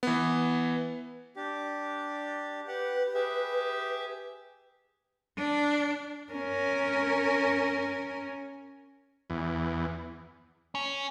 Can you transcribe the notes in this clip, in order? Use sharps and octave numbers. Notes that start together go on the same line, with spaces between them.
E3 B3
D4 G4
G4 B4 F#5
G4 G#4 E5
D4
C#4 A#4
E2
C#4